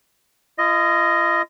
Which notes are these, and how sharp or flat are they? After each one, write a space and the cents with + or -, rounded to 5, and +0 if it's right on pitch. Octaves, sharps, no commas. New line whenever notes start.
F4 -45 D#5 +0